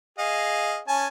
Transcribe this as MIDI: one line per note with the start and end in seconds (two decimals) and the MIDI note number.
0.19 0.80 68
0.19 0.80 75
0.19 0.80 77
0.88 1.07 61
0.88 1.07 80
0.88 1.07 81